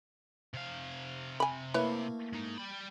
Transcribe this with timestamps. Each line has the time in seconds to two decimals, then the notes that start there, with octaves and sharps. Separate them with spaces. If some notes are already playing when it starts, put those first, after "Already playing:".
0.54 C3 F5
1.40 G#5 B5
1.74 A3 A#3 E4 B4 C#5
2.33 G#3 D#4
2.58 G3 B5